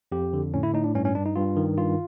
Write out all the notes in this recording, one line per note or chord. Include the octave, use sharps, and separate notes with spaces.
F2 G4
D3
A2 C#4
E4
A2 D#4
D4
G2 C#4
C#4
G2 D4
D#4
G2 F4
D#3
G2 F4